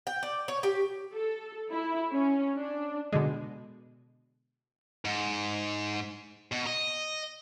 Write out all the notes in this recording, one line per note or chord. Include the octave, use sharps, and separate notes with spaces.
G5
D5
C#5
G4
A4
E4
C#4
D4
B2 D3 G#3
G#2
B2
D#5